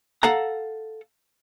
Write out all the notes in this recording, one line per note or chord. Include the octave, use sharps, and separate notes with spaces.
A4 F5 F#5 A#5